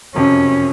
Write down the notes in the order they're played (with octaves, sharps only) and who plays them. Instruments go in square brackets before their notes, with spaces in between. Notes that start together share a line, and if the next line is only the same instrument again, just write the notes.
[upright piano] F#1 F2 C3 F#3 [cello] C#4